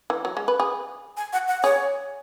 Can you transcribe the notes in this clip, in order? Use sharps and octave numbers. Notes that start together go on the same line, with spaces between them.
E3
F#3
G#3
B4
G#4
G#5
F#5
F#5
G#4 C#5